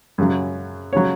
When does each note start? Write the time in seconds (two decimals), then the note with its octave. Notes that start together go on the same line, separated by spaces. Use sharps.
0.18 F#2 C#3 F#3
0.93 C#3 F#3 C#5